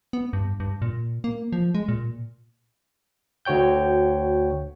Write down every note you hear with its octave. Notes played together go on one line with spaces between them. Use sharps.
B3
G2
G2
A#2
A#3
F3
G#3
A#2
D2 F#4 C#5 G5 G6